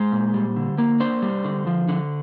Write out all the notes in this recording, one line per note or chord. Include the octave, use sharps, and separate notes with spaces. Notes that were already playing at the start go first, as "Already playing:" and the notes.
Already playing: G#3 C5
A#2
G3
D3
A#3
D4 C5
G3
D3
F3
D3